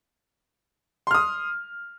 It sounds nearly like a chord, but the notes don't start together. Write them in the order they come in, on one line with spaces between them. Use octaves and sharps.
C6 F6 D#6